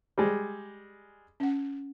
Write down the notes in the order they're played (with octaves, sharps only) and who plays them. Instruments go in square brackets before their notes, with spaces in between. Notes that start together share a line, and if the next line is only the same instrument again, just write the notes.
[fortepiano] G3 G#3
[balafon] C#4 F#5